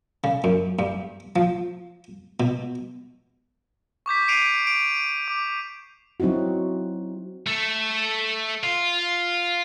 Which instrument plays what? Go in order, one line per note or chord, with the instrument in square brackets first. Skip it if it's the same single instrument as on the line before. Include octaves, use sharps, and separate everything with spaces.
[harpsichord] C#3
F#2
G2
F3
B2
[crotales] C#6 D6 G6 B6
C7 D7 D#7 F7
D7 F7
D6
[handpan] F#3 C4 D#4 E4 F#4
[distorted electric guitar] A3
F4